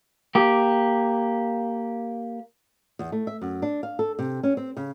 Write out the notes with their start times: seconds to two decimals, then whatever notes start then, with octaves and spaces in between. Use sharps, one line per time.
0.35 A#3 G4
2.99 E2
3.12 A3
3.27 E5
3.41 F#2
3.62 D4
3.83 F5
3.99 A4
4.19 C3
4.43 C#4
4.57 C4
4.77 C#3